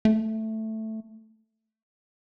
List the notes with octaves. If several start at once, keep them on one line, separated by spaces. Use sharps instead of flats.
A3